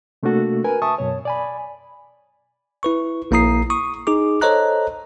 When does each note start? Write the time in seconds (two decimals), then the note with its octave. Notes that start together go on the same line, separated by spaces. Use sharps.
0.23 C3 A3 A#3 D4 F#4 A4
0.64 A#4 B4 G#5
0.82 E5 A5 C#6 D#6
0.98 F#2 B2 C#5
1.25 D5 G#5 B5
2.83 E4 B4 C#6
3.31 A#1 A#3 E4 A#5 D#6 C7
3.70 C#6 D#6
4.07 D#4 G#4 D6
4.41 A4 C5 C#5 D#5 A#5 F#6